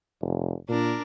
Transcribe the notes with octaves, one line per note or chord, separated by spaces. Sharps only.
F1
A#2 D4 A#4